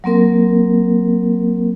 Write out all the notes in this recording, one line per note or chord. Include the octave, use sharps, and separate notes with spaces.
F#3 A#3 C4 A#4